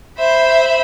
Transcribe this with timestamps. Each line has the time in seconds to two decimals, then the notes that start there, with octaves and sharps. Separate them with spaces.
0.18 C5 E5 B5